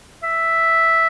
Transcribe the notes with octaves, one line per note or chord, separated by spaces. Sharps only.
E5